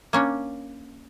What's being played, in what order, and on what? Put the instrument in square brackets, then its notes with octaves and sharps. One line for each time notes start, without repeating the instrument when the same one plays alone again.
[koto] A#3 C#4 D4